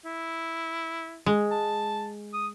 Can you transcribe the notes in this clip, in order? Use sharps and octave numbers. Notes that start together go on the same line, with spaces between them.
E4
G#3
A5
D#6